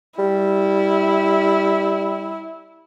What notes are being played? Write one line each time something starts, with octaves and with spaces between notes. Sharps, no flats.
G3 E4